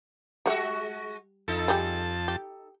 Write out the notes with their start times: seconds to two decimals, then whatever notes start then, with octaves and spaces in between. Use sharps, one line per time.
0.46 G3 G#3 F#4 F#5
1.48 F2 D#4 A4 A5
1.68 G3 G4 G#4
2.28 G4